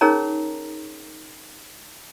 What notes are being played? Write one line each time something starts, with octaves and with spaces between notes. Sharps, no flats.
C#4 D#4 G#4 A#4 C#5 A#5